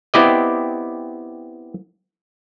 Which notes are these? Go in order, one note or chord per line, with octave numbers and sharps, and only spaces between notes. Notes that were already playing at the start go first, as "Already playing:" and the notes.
B3 C4 E4 G4 D5 D#5